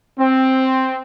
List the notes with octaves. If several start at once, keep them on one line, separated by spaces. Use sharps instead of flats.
C4